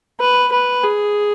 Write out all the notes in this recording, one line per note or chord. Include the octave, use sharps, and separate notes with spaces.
B4
B4
G#4